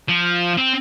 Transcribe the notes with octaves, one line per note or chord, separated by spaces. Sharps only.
F3
C4